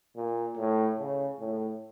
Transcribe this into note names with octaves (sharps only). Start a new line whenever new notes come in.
A#2
A2
C#3
A2